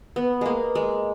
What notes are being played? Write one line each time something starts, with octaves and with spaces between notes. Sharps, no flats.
B3
G#3 A#3
G#3